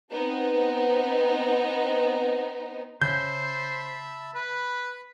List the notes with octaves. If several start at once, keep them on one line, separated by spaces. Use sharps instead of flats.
B3 C4 D#4
C#3 C5 E5 A5 B5 G6
B4 B5